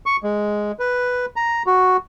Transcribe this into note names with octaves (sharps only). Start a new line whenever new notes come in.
C#6
G#3
B4
A#5
F#4